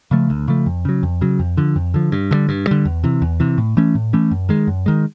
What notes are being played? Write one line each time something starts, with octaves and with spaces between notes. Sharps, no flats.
C#3 F3 A3
D2
C#3 F3 A3
F2
C#3 F#3
F2
C#3 F#3
F2
D3 F3
F2
D3 F3
G2
D3 G3
G2
D3 G3
E2
C3 E3
E2
C3 E3
A2
E3 A3 C#4
A2
E3 A3 C#4
F#2
D#3 G#3
F#2
D#3 G#3